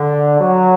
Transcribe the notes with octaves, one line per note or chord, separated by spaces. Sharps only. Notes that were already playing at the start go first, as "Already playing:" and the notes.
Already playing: D3
F#3